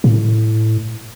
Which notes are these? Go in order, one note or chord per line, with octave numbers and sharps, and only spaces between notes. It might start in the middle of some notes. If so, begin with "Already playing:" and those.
A2